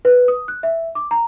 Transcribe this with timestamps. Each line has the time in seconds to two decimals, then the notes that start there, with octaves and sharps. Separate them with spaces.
0.05 B4
0.28 D#6
0.48 F#6
0.63 E5
0.95 D6
1.11 A#5